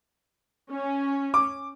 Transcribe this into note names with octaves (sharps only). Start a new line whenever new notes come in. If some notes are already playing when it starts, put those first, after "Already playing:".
C#4
D6